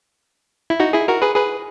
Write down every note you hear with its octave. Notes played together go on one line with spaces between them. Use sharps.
E4
D#4 F#4
E4 G#4
F#4 A#4
G#4 B4
G#4 B4